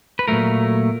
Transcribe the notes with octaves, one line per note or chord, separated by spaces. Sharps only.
B4
A#2 F#3 A3 A#4